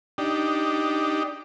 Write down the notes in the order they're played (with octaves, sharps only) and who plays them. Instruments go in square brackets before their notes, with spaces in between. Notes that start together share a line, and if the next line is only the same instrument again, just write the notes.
[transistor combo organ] D4 D#4 G4